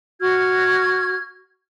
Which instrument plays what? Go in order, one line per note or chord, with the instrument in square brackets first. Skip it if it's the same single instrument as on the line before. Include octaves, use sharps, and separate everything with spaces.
[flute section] F#4 F6 G#6